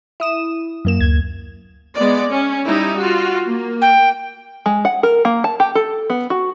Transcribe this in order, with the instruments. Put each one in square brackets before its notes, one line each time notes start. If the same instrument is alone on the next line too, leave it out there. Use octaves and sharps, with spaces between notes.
[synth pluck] E4 D#6 E7
F#2 A#3 E7
[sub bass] D2 [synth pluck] G#6
[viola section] G#3 B3 D5
C#4
G3 D#4 E4
F4 F#4
A#3
[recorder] G5
[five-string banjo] G#3
F#5
A#4
A#3
A5
G4
A4
B3
F#4